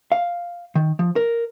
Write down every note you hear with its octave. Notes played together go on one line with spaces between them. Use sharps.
F5
D#3
F3
A#4